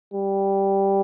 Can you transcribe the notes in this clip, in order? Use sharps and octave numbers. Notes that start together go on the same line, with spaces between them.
G3